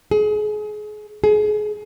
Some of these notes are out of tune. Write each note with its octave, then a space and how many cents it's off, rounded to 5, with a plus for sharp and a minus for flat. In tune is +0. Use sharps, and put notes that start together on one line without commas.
G#4 +30
G#4 +30